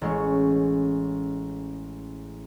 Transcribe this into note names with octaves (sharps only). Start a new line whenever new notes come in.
A1 G#3 C#4